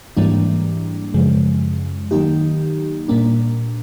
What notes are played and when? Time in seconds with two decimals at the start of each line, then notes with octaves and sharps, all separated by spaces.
0.17 G#2 E3 G3 A#3 D4
1.14 F#2 C#3 F3 G#3
2.11 D#3 F#3 A#3 D#4 G4
3.08 A#2 G3 A#3 D4